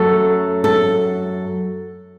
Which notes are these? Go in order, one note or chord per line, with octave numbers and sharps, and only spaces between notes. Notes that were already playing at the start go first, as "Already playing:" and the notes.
Already playing: F#2 F#3 A3 A4
A4